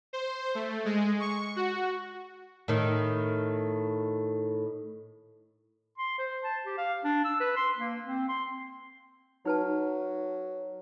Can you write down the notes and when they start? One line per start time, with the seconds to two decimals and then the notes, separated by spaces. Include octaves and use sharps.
0.13 C5
0.55 A3
0.85 G#3
1.20 C#6
1.56 F#4
2.68 A2 D#3
5.98 C6
6.18 C5
6.44 A5
6.66 G4
6.78 F5
7.04 D4
7.24 E6
7.40 B4
7.56 C6
7.78 A#3
8.04 C4
8.29 C6
9.45 F#3 D#4 B4 A5